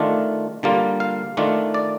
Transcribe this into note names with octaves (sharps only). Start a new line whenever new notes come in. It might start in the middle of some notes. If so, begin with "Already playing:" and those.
Already playing: D#3 A3 D4 F4
D3 G3 A#3 F4
F5
D#3 A3 D4 F4
D5